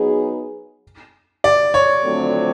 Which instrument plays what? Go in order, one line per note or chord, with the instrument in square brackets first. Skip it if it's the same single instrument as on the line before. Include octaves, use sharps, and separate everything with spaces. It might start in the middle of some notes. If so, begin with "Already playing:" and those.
Already playing: [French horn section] F#3 B3 D#4 G#4
[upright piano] D5
C#5
[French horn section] F2 D3 F#3 A3 C4